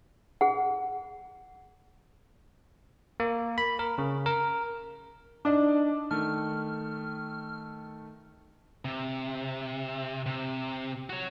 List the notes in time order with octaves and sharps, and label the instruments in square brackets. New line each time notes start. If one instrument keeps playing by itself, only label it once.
[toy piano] G#4 F#5
[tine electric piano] A#3
B5
A#4
C#3
A#4
[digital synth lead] D4 [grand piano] D#4 D5 D6
[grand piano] D#3 A3 [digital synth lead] F6
[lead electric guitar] C3
C3
F#4 C#5